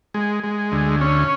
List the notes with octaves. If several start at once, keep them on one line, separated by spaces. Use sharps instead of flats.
G#3
G#3
D2
C#4